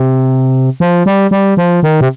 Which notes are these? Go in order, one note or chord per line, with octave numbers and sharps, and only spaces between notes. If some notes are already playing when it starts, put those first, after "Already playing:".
Already playing: C3
F3
G3
G3
F3
D#3
C3